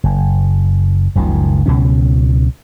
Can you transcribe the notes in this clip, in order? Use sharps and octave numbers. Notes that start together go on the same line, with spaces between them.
F#1
F#1 C#2 D#3 F3
C#2 B2 F#3 C#4